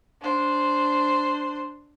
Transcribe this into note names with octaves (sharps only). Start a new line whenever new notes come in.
D4 C5